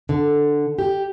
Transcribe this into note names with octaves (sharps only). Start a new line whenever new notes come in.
D3
G4